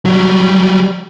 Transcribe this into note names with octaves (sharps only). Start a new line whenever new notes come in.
F#3 G3